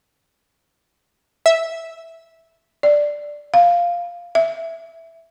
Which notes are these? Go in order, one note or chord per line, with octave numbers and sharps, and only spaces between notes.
E5
D5
F5
E5